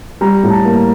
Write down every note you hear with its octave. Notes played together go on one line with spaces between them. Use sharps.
G3 A#5
A2
A5
A#3